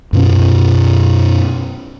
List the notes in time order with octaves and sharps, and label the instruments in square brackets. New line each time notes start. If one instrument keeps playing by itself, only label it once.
[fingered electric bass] F#2 B2 C#4